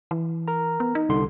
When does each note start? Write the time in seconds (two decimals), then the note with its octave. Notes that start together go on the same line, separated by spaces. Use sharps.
0.11 E3
0.48 A#4 A#5
0.80 B3
0.95 D#4
1.09 C2 D3 C6